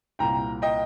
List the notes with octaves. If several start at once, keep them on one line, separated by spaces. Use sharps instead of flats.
C2 A#2 G5 A#5
D#5 G5